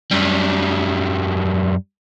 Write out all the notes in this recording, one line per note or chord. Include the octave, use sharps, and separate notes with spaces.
F#2 G3